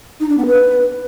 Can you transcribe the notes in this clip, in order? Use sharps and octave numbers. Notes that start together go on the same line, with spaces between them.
D#4
D4
B3
B4